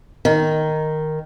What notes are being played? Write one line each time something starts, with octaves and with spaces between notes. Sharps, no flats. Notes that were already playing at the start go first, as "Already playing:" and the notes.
D#3